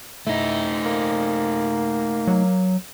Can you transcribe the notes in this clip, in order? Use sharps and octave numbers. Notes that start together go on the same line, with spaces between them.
A3 D#4 E4
A#3
F#3